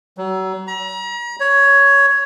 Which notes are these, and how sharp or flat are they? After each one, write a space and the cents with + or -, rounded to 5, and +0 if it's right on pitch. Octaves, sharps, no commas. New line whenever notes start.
F#3 +35
A#5 +40
C#5 +10